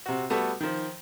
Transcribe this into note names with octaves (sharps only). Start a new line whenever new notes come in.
C3 F#4
G3 A3 B3 F#4 A4
D#3 F3